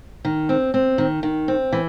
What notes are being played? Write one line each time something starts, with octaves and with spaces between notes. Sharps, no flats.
D#3
C4
C4
D#3
D#3
C4
E3